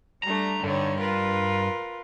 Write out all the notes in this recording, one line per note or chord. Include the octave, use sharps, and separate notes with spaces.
G3 A3 D4 A#5
G2 D3 D#4 C#5
F4 A#4 B4